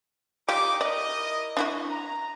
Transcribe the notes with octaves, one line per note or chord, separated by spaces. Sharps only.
G3 D#4 F4 G4 D6
E4 A#4 D5 D#5
D4 E4 F#4
A#5